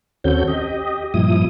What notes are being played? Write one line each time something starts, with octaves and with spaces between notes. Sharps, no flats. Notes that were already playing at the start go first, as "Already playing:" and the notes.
D#2 C4 C#4 F#4 A4 G6
G4 D#5
G2 A#2 F3 E4 D#6